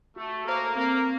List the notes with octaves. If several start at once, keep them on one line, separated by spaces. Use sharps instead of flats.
A3 F#4
A#3 A4 C5
A#3 C4